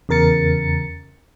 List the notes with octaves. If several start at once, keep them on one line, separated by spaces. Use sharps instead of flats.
E2 C#3 A#4 A6 C#7